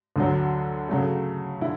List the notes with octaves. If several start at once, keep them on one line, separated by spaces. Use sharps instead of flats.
D2 D3 F#3
C#3 F#3 A3
D3 E4